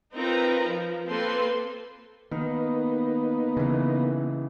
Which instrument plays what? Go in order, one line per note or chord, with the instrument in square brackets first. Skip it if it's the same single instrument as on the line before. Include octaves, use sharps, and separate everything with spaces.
[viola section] C4 D#4 F4 A#4 B4 A#5
F3
A#3 C4 A4 B4 C6
[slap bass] D#3 [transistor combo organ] A#3 B3 D#4
[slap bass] C#3 E3